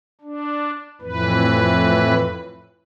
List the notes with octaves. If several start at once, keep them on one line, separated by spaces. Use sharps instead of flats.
D4
F2 A2 E3 B4